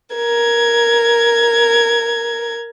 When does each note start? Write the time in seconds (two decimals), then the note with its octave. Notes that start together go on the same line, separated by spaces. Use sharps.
0.15 A#4 G#6